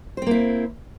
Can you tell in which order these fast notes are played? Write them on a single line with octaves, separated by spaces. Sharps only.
C5 C4 A#3 E4